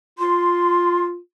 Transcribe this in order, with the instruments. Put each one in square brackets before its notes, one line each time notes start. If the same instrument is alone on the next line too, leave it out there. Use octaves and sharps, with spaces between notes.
[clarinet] F4 [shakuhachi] C6